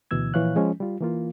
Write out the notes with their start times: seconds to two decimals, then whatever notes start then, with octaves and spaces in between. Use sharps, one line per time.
0.11 D2 B2 E3 E6 G#6
0.34 A#2 E3 F3 C#5 F5 F#6
0.56 F3 G#3 C#4
0.80 G3 F4
1.01 E3 A#3 F4